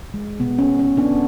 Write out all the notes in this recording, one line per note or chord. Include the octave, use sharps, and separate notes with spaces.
G#3
B2 B3
C#4
B2
C#4
G#3
B3 D4